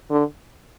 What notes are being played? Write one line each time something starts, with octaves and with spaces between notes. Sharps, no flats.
D3